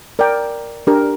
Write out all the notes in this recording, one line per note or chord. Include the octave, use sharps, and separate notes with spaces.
A#4 D5 G5
D4 G4 A#4